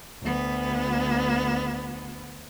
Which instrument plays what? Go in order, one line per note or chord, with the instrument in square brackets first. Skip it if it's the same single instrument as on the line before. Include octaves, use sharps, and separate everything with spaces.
[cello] D2 B3